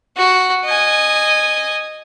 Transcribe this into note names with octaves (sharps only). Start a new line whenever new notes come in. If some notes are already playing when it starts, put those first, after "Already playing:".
F#4
D#5 G#5